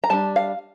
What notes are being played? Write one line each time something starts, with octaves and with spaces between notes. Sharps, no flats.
A#5
G3 D4 A5
F5